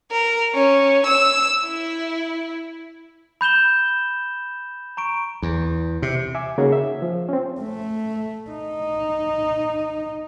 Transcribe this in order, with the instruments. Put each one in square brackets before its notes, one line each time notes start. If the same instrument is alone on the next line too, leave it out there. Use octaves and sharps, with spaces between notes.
[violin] A#4
C#4
E6
E4
[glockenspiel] B5 G6 E7 G7
A#5 C#6 D7
[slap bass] E2
C3
[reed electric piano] E5 G#5 D6
C#3 A#3 C#4 D#4 F#4 G#4
E5
F3
C4 C#4
[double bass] A3
D#4